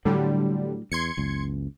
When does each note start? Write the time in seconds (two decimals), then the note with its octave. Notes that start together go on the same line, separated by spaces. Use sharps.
0.05 A2 D3 F#3 G3
0.92 E2 C6 G#6 C#7
1.17 F#1 C#2